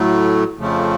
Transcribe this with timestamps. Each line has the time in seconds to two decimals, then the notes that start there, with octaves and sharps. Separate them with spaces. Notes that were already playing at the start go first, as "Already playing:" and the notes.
Already playing: A2 F#3 A3
0.58 F2 C#3 F3 A3